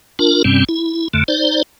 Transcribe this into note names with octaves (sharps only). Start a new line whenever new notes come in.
D4 F4 A#4
G2 C3 G3 C4 C#4
E4
F2 D3 A3
D#4 C5 D5